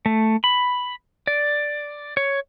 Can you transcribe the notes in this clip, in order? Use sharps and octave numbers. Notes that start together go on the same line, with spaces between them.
A3
B5
D5
C#5